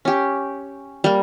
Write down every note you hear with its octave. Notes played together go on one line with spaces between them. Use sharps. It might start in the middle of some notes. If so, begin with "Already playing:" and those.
C#4 G4
G3 A#3